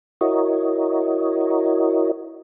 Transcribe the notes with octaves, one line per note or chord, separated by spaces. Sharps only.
E4 F#4 A#4 C#5 D#5